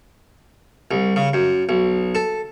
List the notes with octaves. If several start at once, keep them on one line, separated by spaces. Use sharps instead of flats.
C2
C#3
F#2
B1
A4